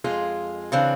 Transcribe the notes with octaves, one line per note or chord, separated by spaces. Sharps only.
F2 G#3 F4 G#4
C#3 E3 C4 D4